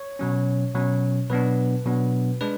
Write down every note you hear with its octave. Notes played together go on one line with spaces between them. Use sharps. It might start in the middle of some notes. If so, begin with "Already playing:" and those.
Already playing: C#5
B2 F#3 C#4
B2 F#3 C#4
B2 F#3 B3 D4 B4
B2 F#3 B3 D4
G#3 D4 B4